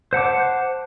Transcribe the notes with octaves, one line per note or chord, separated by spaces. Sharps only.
C5 F#5 A5 D6